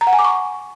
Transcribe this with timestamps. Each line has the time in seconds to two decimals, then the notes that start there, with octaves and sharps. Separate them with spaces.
0.01 A#5
0.07 F#5
0.13 G#5
0.19 D6
0.25 C#6